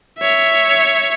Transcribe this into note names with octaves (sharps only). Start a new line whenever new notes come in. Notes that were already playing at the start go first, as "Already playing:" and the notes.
C#5 E5